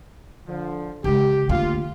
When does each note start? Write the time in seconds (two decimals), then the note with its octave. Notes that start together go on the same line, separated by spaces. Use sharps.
0.47 D3 F3
1.04 C#3 G#3 G4
1.49 D2 A#3 F4